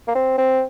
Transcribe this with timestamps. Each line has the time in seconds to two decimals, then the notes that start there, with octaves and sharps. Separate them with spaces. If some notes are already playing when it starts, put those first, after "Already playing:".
0.08 A#3
0.15 C4
0.38 C4